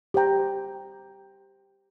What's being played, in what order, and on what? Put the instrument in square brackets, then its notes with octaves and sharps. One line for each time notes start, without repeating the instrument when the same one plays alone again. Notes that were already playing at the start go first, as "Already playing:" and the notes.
[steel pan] G4 C5 G5 A#5